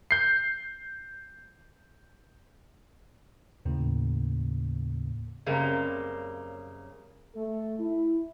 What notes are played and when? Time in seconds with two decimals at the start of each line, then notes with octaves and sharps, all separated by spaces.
0.11 G6 C7
3.65 D#2 A2 C#3 A#3
5.46 F#2 C#3 G3 A#3 C4
7.35 A3 A4
7.79 E4